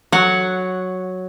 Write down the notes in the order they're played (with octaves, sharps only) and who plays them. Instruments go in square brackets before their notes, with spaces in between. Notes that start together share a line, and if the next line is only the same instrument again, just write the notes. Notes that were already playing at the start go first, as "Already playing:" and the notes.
[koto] F#3 F#5